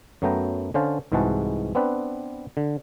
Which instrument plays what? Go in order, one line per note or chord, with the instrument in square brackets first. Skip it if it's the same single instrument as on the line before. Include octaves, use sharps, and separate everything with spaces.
[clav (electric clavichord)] F#2 F#3 A3 B3 G5 A#5
D3 C#4 C5 F5 A5
C2 G#2 E3 G#3 F#4 A5
B3 C4 D4 B4
D3